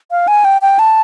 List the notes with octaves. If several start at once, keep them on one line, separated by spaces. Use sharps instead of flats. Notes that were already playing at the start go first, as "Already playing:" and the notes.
F5
G#5
G5
G5
A5